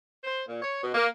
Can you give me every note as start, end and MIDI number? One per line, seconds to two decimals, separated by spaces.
0.24 0.42 72
0.48 0.60 46
0.62 0.79 73
0.82 0.92 47
0.93 1.06 58